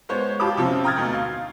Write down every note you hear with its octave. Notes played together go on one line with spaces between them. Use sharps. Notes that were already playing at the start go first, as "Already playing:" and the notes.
G#3 B3 C5 C#5
F4 G4 A5 B5 D6
C3 F3 C4 C#4
G5 A#5 D#6 F6 G#6 A6
D2 B2 D#4
F5